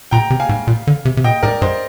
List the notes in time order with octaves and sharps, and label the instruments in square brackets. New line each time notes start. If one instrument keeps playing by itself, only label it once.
[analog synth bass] A#2 [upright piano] G5 A#5
[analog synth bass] C3
[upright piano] F5 G#5
[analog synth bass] G#2
A#2
D3
C3
C3
[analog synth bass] A#2 [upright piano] D#5 G5
[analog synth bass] G#2 [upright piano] A#4 D5
[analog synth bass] G2 [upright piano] C5 D#5